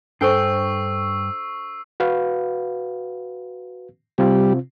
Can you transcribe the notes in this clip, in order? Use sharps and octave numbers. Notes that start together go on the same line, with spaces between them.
G2 D4 A4 C5 G5 C#6 E6 C7
F#4 B4 F5
C3 G3 C4 F4